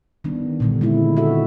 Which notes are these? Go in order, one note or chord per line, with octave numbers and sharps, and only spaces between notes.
D#3 G3 B3 D4
A#2 D3 G3
G#3 A#3 C4 E4
F#4 A4 E5